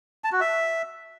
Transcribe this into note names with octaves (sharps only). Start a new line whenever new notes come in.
A5
F#4
E5